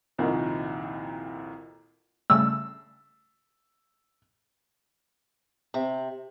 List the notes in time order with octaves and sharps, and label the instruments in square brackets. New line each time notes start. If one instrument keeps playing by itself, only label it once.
[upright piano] C2 F2 A#2 D#3
[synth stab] C#3 G3 A3 [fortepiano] E6
[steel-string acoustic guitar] C3